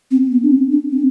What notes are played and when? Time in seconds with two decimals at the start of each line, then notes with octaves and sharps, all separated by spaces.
0.11 C4
0.31 B3
0.43 D4
0.52 C4
0.72 D4
0.91 C4